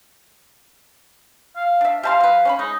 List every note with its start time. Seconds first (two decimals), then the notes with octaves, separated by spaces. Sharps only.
1.56 F5
1.81 D4 E5
2.03 G4 F5 A5 C6
2.20 F#3 B4
2.45 C#4 B4 B5
2.59 G#3 D#4